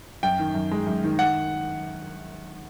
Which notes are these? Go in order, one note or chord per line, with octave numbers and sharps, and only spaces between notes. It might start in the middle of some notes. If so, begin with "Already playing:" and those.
F#2 G5
D#3
F#2
G#3
F#2
D#3
F#5